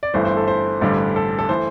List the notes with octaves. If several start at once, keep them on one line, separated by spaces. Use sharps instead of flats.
D5
G1 G2 E3 A3 C5
C5
A4
C5
A1 G2 D3 G3
A4
A4
E3 A3 C5